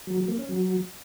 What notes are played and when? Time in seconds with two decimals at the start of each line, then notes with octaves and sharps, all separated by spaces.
0.07 F#3
0.18 F#3
0.28 A#3
0.38 C#4
0.49 F#3